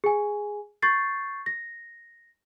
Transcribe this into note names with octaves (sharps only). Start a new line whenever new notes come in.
G#4 G#5
C#6 G6 A6 C7
A#6